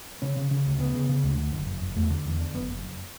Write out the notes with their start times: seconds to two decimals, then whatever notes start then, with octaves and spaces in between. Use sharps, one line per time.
0.22 C#3 C#4
0.37 C#3
0.51 C#3
0.66 D2
0.80 C#3 B3
0.95 C#3
1.09 C#3
1.24 D2
1.38 D3
1.53 F#1
1.67 F#1
1.82 F#1
1.96 E2 A3
2.10 D3
2.25 E2
2.40 D3
2.54 F#1 B3
2.69 F#1
2.83 F#1